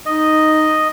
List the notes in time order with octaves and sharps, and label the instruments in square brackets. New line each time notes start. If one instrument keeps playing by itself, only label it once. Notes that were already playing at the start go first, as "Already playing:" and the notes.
[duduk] D#4 [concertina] D#5